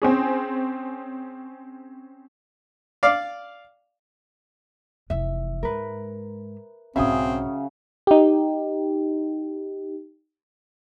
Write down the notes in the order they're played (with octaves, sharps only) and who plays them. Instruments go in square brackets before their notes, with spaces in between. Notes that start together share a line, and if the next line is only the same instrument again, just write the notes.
[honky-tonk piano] C4 C#4 G#4
[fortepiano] D5 F5
[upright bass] F1 E3 [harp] E5
[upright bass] G#2 G#3 [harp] A#4 B4
[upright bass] B1 G#2 [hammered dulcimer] C#3 F#3 [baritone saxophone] C4 [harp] E5 G#5 D#6
[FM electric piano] D#4 G4